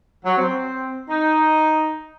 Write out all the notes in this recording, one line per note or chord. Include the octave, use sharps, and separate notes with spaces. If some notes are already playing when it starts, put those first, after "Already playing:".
F#3
C4
D#4